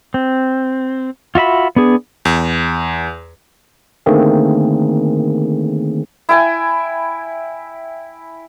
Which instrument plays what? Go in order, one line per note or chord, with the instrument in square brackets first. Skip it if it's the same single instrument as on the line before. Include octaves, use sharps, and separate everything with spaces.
[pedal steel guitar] C4
F4 F#4 E5 B5
B3 D4 G#4
[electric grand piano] E2
[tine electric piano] D3 D#3 A3 A#3 C4 G#4
[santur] E4 G5 G#5